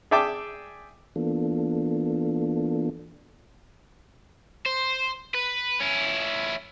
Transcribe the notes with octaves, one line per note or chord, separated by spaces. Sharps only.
G#4 D5 E5 G5 A5 D6
E3 A#3 B3 D4 F4 A4
C5
B4
C#4 E4